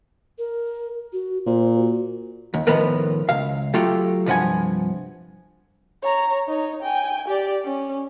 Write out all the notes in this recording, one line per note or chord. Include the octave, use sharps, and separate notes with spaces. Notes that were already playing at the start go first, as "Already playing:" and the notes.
A#4
F#4
A#2 C5
F#4
D#2
A2 D#3 F3 B3 A#4 B4
C#2 F5
F#3 A3 F4 G4
C2 G2 F3 F#5 G#5
C#5 A#5
D#4 C#5
G5 G#5
G4 D5
C#4